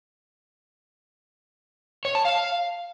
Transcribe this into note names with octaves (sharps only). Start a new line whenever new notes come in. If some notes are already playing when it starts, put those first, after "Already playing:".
C#5
A5
F5